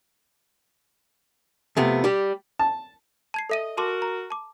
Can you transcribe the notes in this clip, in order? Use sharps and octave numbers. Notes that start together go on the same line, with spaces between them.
F2 C3 A3 B3
G3 G4
A5
A5 G#6 C7
A4 D#5 E5 D#7
F#4 A#4 A5 C6 D6
A#5
A5 D6